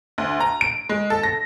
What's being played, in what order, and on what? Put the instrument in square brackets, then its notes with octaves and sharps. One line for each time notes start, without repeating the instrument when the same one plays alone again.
[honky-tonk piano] D2
A#5
D7
G#3
A4
A#6